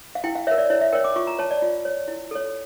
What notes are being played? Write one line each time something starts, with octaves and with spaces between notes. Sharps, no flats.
F5
E4 G5
F5
A#4 C#5 E5
D5
E4 C#5
E5
A#4 C#5 G5
D6
F4 C#6
A#5
C#5 A5
D5
F4
C#5
E4
A4 C#5